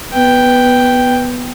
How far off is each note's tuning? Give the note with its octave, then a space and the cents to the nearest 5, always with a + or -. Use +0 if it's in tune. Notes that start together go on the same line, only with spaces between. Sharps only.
B3 +0 G5 +0